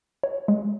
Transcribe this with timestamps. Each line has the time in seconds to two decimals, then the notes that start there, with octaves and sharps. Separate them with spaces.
0.23 C#5
0.48 G#3